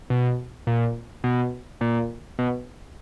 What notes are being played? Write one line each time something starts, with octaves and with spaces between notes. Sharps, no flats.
B2
A#2
B2
A#2
B2